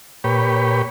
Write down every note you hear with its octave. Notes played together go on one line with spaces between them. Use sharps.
A#2 G4 B4 C#5